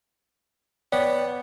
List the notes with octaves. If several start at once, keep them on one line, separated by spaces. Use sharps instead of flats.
B3 C#5 D5 G5